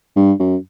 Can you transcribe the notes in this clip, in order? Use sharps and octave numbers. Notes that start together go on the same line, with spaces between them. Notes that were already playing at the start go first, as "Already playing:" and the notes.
G2
F#2